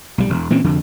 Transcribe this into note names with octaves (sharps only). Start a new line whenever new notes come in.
B1 G3
E1
A#2 E3 C4 C#4
F1 F2 D3